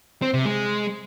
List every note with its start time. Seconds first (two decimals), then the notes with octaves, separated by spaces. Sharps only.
0.22 C4
0.34 C3
0.45 G#3